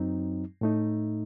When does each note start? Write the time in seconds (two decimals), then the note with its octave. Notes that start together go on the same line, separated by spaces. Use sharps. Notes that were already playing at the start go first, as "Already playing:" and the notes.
Already playing: F#2 F#3 C4 D#4
0.61 A2 A3 D#4